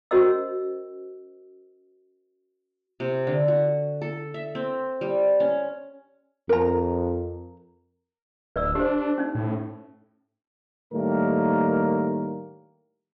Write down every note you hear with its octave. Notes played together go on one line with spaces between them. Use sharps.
C#4 F#4 A#4 C5 D#5 E6
C3
D3
F#4
A4
E5
C4
G3
C#4
F2 A#4 A#5
D1 B4 D5 E6
D4 G4 C5
C#4 D#4
A2
A2 D#3 G3 A3 A#3 A#4